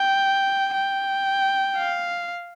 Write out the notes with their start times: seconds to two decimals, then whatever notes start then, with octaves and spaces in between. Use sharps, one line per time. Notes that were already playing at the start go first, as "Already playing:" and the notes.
Already playing: G5
0.73 G5
1.77 F5